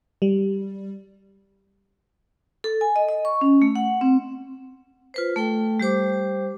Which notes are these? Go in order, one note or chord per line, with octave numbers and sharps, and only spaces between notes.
G3
A4
G#5
D#5
D#5
C#6
C#4
A3
F#5
C4
F4 B4 C5
A3 A4 G5
G3 G4 C5 D6